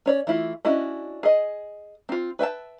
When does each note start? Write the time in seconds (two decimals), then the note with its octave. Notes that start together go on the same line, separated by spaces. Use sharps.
0.06 C#4 C#5 D5
0.27 E3 A3 E4 F4
0.65 C#4 D4 E4 F#4 D#5
1.23 G#4 D#5
2.09 C4 F4
2.39 B4 E5 G5 A5